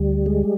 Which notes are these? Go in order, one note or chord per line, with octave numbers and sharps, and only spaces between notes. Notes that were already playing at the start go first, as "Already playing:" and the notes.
Already playing: D2 G3
G#3